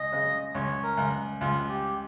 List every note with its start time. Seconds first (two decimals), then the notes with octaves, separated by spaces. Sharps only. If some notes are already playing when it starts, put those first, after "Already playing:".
Already playing: C#2 D#5
0.12 C#3
0.54 C#2 C#5
0.83 A#4
0.97 C#2
1.41 C#2 F4
1.69 G4